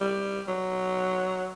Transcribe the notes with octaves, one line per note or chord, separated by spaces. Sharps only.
G3
F#3